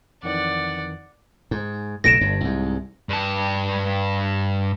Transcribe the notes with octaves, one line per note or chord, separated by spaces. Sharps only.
F2 D#3 E3 D5 F#5
G#2
B1 A2 D3 A#6 D7 E7
G1 G2
C2 G#2
G2 A5